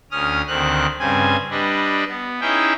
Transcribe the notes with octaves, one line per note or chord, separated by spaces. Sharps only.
D2 C#4 D#6 F6
D2 D#3 C4 F#6
G2 C#3 C4 G#5
G3 D4 B4 D#5
B3
C#4 D#4 E4 G#4 E5 G5